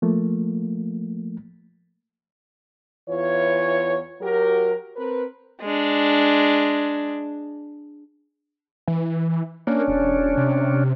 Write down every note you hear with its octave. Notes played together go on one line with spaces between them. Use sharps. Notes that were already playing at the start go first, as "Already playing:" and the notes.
F3 A3 A#3
E2 E3 F4 C#5
F#3 F#4 G4 A#4
C4 A#4 B4
G#3 D4
E3
A#3 C#4 D4
E1
C3